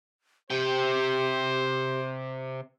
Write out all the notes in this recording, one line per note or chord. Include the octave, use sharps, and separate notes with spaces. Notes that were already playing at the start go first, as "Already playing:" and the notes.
C3 G4 C5 G5